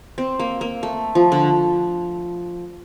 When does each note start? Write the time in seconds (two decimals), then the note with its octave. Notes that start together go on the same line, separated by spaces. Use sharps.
0.18 C4
0.39 A#3
0.61 A#3
0.83 A3
1.15 F3
1.32 D3